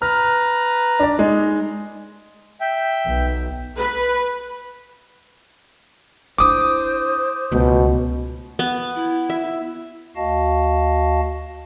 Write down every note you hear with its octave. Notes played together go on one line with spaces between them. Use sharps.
B4 A#5 F6
D4 D5
G#3 D#4
E5 G5
B1
B4
D4 E4 C5 D6 D#6
C#2 B2 A3
B3
E4
E5
D2 F#4 D#5 F5 A5